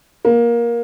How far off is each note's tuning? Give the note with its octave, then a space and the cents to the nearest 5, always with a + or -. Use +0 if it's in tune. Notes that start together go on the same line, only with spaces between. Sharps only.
A#3 +15